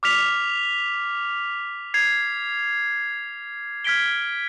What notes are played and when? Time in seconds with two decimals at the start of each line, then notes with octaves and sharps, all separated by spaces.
0.03 D6 F6 B6 F7
1.94 G#6 C7 F7
3.84 F6 G#6 B6 D7 G7